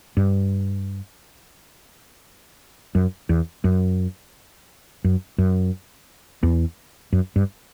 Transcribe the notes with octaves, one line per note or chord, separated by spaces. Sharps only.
G2
F#2
E2
F#2
F#2
F#2
E2
F#2
G2